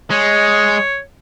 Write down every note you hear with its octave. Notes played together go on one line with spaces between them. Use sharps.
G#3 C#5